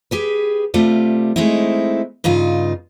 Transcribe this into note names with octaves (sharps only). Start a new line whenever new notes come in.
G4 G#4 B4
C3 G3 A3 F4
G#3 A3 C4 D#4 E4
G2 C#3 D#4 F4